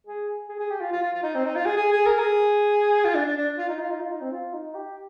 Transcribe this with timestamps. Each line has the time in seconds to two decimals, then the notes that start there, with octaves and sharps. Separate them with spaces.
0.07 G#4
0.49 G#4
0.59 G#4
0.70 G4
0.81 F4
0.92 F4
1.03 F4
1.13 F4
1.23 D#4
1.35 C4
1.45 D#4
1.55 F4
1.66 G#4
1.76 G#4
1.92 G#4
2.06 A#4
2.19 G#4
3.05 F4
3.15 D4
3.26 D4
3.37 D4
3.58 F4
3.68 D#4
3.79 F4
3.90 D#4
4.00 F4
4.11 D#4
4.21 C4
4.32 F4
4.53 D#4
4.74 G4